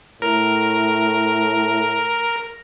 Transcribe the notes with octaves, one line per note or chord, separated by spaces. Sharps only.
A2 A#4